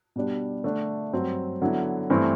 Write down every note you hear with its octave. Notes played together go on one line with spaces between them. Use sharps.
B2 G3 D4
D3 A3 D4
G2 F#3 C4
D3 F#3 B3 E4
G2 E3 A3 C4 E4